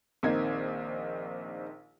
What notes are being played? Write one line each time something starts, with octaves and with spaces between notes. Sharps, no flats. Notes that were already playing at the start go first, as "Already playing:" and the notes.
A#1 D#3 A#3 C4 D#4 G#6